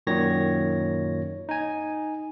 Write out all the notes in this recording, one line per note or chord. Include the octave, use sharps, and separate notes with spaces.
F#2 A#2 D#3 F#3 C#5 A#6
D#4 G#5